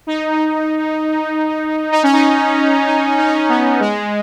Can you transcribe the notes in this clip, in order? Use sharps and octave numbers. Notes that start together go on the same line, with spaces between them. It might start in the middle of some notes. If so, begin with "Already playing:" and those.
D#4
D#4
C#4
D#4
D#4
D#4
C#4
D#4
B3
G#3